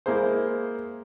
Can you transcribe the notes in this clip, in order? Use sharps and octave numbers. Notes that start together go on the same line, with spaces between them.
G#3 A#3 E4 G#4 C5